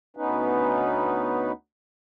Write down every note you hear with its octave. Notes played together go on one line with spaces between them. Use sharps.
D2 B3 C#4 D#4 B4